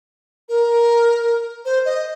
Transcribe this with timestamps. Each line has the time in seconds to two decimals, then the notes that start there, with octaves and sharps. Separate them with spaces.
0.49 A#4
1.65 C5
1.85 D#5